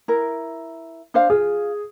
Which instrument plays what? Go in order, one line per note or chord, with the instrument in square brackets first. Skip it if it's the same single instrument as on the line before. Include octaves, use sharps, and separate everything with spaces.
[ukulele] E4 A#4
D4 C5 F5
[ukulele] F4 [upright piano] G#4